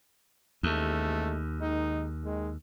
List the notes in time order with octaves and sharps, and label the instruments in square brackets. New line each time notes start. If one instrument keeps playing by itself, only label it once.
[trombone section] A1 G#3 A3 [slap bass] D#2
[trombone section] D#3 G#3 D#4
D#3 G#3